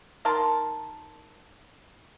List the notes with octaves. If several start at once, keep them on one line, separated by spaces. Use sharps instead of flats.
D#3 A#4 A5 C6